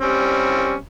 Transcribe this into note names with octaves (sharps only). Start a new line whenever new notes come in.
G3 C4 C#4